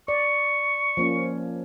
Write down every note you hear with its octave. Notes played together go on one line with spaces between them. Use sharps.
D5 C#6
F3 A#3 C#4